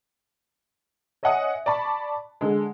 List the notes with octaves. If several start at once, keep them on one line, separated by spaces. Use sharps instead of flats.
C#5 D#5 E5 F#5 G#5 D#6
D5 A5 B5 C#6
D3 G#3